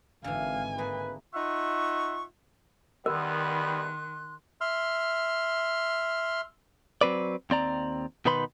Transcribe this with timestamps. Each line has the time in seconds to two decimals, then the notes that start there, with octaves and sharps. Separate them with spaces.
0.24 G#1 D3 E3 F5 G#5
0.78 A3 A#3 G#4 B4
1.34 D#4 F4 E5 F#5 C#6
3.06 E2 D#3 G3 B3 A#4 C6 F#6
4.61 E5 C6 F6
7.01 F#3 C4 B4 D5
7.50 D#2 C4 D5 A#5
8.25 B2 D#3 D#4 B4 B5 C6